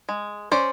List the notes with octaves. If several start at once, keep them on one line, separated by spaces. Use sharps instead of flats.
G#3
C#4 C5 D5